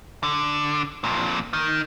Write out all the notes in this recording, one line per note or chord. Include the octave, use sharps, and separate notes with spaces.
D3
F2 A#2
D#3